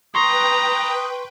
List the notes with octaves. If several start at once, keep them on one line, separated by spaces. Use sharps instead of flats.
B4 G5 A#5 C6 C#6 D#6